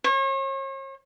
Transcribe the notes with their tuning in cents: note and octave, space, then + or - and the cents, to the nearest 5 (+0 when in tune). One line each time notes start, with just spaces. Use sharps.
C#5 -40